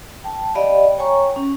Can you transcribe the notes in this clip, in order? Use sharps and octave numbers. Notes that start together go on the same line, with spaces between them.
G5 A5
G4 D5 D#5 F5 G5 B5
C#5 G5 G#5 A#5 C#6
C#4